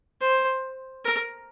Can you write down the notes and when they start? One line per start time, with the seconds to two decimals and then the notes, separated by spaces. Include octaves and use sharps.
0.21 C5
1.05 A#4